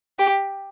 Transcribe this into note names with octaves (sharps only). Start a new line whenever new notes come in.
G4